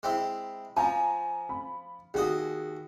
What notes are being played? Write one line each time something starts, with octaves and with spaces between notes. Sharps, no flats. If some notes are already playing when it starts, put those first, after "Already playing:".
G#3 C4 E4
F3 G#5 A#5
B5
D#2 F#4 G#4 D#5